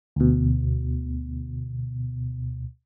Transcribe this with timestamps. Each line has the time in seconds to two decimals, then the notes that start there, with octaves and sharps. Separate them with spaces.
0.16 D2 B2